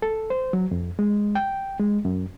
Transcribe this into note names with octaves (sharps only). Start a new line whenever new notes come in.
A4
C5
F#3
F2
G#3
G5
G#3
F#2